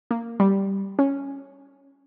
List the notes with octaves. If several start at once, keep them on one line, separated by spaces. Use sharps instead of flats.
A#3
G3
C#4